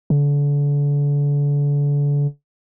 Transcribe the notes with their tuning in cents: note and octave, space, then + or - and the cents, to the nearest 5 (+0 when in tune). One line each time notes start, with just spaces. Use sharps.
D3 -35